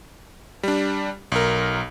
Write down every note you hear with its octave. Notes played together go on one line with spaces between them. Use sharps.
G3 D4
B1 A#4